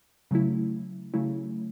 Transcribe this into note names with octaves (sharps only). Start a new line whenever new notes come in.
C#3 F#3 A3 E4
C#3 F#3 A3 E4